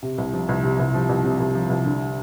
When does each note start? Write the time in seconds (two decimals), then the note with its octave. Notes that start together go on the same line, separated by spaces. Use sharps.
0.03 C3
0.18 C2
0.33 F3
0.49 C2
0.63 C3
0.79 C2
0.94 F3
1.09 C2
1.24 C3
1.40 C2
1.55 F3
1.69 C2
1.85 D3